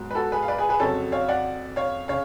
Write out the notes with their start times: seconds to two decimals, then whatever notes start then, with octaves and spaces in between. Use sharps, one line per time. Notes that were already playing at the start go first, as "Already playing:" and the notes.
Already playing: G#2 F#3 B3
0.11 B4
0.15 F#4 A4
0.32 G#4 B4
0.43 F5
0.48 B4 D5
0.58 G#4 B4
0.69 G#4 B4
0.80 F2 C#3 F#3 A4 C#5
1.12 C#5 F5
1.28 D5 F#5
1.76 C#5 F5
2.08 C#3 C#5 F5